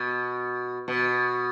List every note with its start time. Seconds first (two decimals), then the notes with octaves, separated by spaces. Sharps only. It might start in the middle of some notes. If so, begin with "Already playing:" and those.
Already playing: B2
0.88 B2